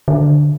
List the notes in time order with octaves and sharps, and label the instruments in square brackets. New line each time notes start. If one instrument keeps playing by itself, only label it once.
[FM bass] D3